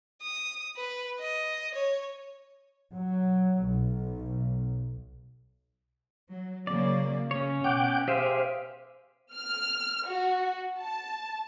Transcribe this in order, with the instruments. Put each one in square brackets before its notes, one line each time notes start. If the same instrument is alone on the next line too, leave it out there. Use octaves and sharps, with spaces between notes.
[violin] D#6
B4
D#5
C#5
[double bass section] F#3
B1
[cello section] F#3
[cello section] C#3 F#3 A#3 [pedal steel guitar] D5
[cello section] C#3 [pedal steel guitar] C#4 C#5
[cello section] B2 [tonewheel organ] F#5 G5 D6
[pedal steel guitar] G4 G#4 E5 [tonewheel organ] C5 F5
[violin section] F6
F#4
A5